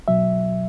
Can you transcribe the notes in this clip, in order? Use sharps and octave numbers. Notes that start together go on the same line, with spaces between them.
B2 F#3 E5